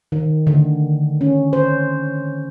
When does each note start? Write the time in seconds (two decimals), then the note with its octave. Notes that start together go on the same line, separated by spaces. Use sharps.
0.12 D#3
0.47 D3
1.21 C#4
1.53 C5